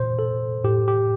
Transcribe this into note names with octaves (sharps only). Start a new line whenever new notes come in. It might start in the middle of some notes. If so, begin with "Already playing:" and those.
Already playing: A#2 C5
A4
A2 G4
G4